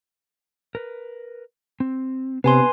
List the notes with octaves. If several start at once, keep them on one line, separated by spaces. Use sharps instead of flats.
A#4 B4
C4
C3 B3 D4 B4 G#5 C6